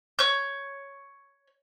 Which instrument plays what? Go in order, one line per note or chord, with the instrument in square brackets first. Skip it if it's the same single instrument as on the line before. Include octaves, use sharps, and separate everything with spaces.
[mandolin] C#5 G6